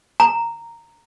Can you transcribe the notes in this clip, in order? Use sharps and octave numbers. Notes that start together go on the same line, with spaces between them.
A#5